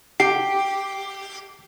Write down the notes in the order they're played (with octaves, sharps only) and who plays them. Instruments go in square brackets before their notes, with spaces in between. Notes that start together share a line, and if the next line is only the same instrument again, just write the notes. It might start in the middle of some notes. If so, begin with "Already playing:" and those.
[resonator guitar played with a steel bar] G4 [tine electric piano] C7